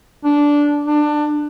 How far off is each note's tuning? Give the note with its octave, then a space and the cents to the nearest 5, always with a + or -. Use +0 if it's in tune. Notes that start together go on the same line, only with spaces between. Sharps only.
D4 -10
D4 +20